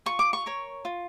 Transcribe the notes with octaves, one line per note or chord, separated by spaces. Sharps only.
F4 C#6
D6
C#6
A#4 C#5
F4